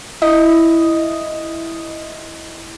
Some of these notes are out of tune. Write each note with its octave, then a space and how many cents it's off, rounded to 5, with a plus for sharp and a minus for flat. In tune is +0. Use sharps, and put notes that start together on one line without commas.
E4 +0 D#5 +0